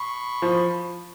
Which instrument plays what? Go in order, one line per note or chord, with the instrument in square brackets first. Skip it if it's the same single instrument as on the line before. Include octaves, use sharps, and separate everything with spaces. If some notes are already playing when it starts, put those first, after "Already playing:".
Already playing: [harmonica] B5 C#6
[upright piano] F3